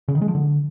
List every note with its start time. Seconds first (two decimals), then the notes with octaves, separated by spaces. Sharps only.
0.08 C#3
0.15 D#3
0.21 G#3
0.28 F3
0.35 D3